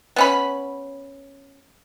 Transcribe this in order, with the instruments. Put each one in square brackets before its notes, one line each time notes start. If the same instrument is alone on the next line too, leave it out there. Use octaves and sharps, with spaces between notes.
[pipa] B3 C#4 B5